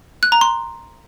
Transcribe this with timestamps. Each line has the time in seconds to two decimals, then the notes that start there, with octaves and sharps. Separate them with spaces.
0.23 F#6
0.32 A#5
0.41 C6